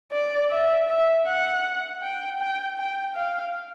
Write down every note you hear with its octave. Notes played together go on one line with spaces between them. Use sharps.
D5
E5
E5
F#5
G5
G5
G5
F5